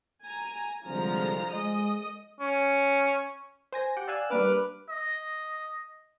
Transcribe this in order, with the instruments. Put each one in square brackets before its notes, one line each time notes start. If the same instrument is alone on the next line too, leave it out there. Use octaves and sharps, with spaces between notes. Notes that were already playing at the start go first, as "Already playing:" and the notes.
[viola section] G#5 A#5
[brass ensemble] C2 D3 [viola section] F3 G#3 A#5
[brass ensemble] G#3 [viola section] D#5
[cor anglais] C#4
[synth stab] C5 G#5 A#6
G4 F#5 G5
[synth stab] D5 F5 G#5 [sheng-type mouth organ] E6 F#6
[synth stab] G3 A#3 D4 [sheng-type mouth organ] B4 D6 F6
[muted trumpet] D#5